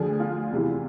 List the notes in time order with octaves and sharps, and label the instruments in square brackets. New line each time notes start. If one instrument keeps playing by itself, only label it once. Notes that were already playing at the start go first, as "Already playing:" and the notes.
Already playing: [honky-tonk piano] D2 D3 F3 G#4
F4
E2 C3 E3